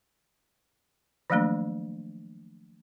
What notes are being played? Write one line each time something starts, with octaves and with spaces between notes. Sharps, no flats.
D#3 F3 F#3 A3 A#3 D4